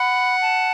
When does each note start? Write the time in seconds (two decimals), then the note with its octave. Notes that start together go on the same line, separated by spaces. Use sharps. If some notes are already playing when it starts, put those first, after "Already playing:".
Already playing: F#5 B5
0.42 A5